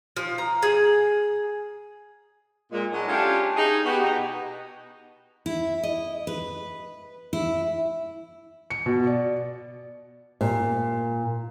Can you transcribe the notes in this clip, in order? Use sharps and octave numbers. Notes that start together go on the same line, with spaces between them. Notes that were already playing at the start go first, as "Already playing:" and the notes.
F3
A#5
G#4
A#2 G#3
F#3 G#3 D4 D#4
C#4 D4 E4 F4 G4 A4
D#4 G#4
B3 F#4 G4
B2 D#4
E4
D#5
B4
E4
C#7
B2
D5
A#2